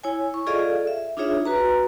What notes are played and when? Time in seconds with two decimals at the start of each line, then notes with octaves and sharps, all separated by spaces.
0.04 E4 C#5 G#5
0.34 C#6
0.47 F4 G#4 A4 D5 D#5 F5
0.87 E5
1.17 D4 D#4 F4 G#4 C#5 E5
1.45 F#4 B4 A#5